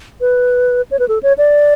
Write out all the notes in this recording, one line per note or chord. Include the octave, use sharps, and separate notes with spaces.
B4
C#5
B4
A4
C#5
D5